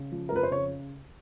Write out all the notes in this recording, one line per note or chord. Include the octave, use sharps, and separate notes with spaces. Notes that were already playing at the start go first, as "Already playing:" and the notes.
Already playing: C#3
F3
A#4
F2 B4
C5
C#3 C#5